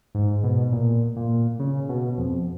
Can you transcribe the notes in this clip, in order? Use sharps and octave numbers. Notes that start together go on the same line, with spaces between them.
G#2
B2
A#2
A#2
C#3
B2
F2